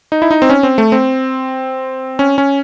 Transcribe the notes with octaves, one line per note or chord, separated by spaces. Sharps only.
D#4
E4
D#4
C4
C#4
C4
A3
C4
C#4
C#4